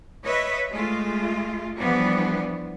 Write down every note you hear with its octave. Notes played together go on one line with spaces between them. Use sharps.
B4 C#5 D#5 E5
G#3 A3 F4
E3 F3 G3 B3 D4